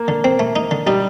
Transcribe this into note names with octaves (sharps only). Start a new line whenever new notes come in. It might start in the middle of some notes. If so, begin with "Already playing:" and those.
Already playing: A#3
D3
C4
A3
D#4
D3
G3 D#4